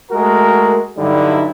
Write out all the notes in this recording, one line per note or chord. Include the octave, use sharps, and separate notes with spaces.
G#3 A3 F#4 A#4
G2 D3 F#3 G3 D#4 E4